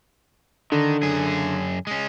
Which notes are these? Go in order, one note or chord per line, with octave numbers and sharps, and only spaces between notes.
D3 D#3
F#2 G#4
G#3 C#4